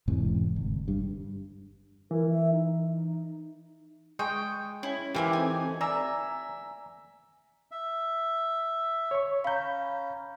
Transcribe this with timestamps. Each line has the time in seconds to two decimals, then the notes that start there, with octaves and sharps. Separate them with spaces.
0.08 E1 G#2 C3 E3
0.56 G1
0.88 G2
2.11 E3 A#4
2.29 E5
2.52 D#4
4.19 G#3 G5 C#6 D#6
4.83 C#4 E4
5.14 E3 A#3 C4 G4 C#5
5.33 C4 D#4 A4 G#5
5.81 D5 E5 G#5 A#5 E6
7.71 E5
9.11 C#5 C#6
9.44 C#4 F5 A#5 B5 G6